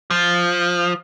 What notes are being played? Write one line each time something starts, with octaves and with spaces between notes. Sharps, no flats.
F3